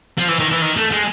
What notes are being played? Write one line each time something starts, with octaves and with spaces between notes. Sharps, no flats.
F3
E3
D#3
E3
D#3
A3
G#3